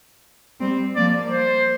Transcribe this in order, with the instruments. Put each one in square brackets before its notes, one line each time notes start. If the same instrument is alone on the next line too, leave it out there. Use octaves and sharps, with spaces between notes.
[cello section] G3 C4
[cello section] F3 A#3 [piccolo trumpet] D5
[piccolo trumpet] C5